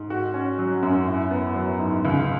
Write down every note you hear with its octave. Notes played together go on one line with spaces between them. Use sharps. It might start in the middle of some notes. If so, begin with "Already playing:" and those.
Already playing: G#2
F#4
C#4
F#3
F#2
E4
B3
F#3
G#2
C#2